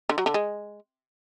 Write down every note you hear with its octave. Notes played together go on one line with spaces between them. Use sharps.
D3
F#3
D3
G#3